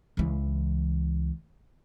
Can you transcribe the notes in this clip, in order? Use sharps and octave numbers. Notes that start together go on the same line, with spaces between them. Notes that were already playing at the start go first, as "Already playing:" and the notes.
C#2 E3